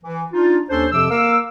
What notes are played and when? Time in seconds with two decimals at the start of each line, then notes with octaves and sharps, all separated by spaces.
0.04 E3
0.33 D4 D#4 F4
0.70 D#2 C#4 D4 A4 C5
0.92 F2 C3 F3 D6 E6
1.11 A#3 A#4 F5 D6 E6